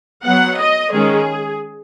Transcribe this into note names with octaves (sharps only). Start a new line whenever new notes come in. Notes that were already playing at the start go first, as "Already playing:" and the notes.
F#3 B3 F#5
D#5
D#3 G#3 C#4 G#4